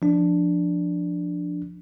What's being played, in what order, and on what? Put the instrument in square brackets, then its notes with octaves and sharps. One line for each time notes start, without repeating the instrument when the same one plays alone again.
[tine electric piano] F3 D4